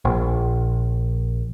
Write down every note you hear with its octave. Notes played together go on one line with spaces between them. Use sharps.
A#1